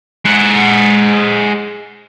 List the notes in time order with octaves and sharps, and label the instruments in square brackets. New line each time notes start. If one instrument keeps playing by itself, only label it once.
[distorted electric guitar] G#3 F#5